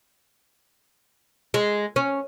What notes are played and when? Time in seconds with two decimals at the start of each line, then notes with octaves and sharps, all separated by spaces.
1.54 G#3
1.96 C#4